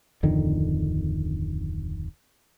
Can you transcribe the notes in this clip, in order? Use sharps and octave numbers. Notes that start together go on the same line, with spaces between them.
D1 F2 D3 D#3